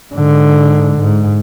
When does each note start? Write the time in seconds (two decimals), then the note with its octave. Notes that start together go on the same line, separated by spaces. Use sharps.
0.13 G#2 D3
0.97 G#2